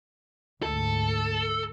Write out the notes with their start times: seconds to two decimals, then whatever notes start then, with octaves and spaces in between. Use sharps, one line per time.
0.63 D2 G#2 A4